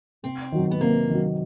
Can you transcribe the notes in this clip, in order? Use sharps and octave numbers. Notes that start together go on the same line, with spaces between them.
C3 C4
D#3 F#3
B3
C3 A#3
D#3 F#3